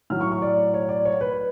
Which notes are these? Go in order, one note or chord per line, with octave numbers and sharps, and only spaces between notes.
A2 F#3 F6
C#6
C#6
D5
C#5
D5
C#5
B4